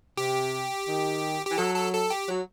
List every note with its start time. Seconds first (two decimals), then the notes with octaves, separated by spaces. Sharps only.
0.17 C3 G4
0.88 D#3
1.46 E3 G4
1.57 F#3 A4
1.75 A4
1.93 A4
2.10 G4
2.28 F#3